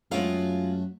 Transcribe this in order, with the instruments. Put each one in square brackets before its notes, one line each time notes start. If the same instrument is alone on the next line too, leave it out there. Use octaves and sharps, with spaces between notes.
[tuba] F#2 [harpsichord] F#3 A3 [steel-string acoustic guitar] G#3 F4 F5